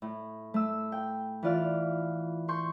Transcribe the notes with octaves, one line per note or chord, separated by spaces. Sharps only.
A2
A3 E6
G5
E3 F4 D5 F6
C6 C#6 G6